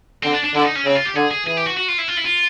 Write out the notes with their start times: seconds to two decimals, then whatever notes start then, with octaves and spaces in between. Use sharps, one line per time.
0.23 D3 C4
0.33 D4
0.44 D4
0.55 D3 E4
0.60 D4
0.64 D#4
0.76 C#4
0.85 C#3 C4
0.95 F4
1.05 G4
1.15 D3 G#4
1.31 G#4
1.46 E3 G#4
1.57 G4
1.67 F#4
1.77 F#4
1.89 F4
1.98 E4
2.08 F4
2.17 E4
2.25 F4